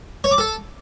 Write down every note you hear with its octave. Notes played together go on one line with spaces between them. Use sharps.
C#5
D6
A4